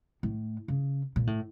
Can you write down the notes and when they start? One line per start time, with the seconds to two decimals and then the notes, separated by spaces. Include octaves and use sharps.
0.23 A2
0.68 C#3
1.16 A#2
1.27 A2